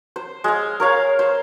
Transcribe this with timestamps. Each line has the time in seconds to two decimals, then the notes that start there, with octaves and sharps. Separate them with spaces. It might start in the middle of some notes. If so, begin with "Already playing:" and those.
0.16 C5
0.44 G#3 F5
0.80 A#4 C#5 F5
1.19 C5